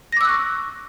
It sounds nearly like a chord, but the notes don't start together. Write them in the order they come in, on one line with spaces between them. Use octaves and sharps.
A#6 D6 E6 F#6 C#6